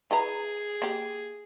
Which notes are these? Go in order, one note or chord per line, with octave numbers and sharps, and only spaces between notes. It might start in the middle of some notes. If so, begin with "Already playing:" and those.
E4 G#4 B4 A#5
A#3 G4